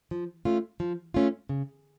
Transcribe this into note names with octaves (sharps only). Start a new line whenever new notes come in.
F3
A3 C#4 F4
F3
A3 C#4 F4
C#3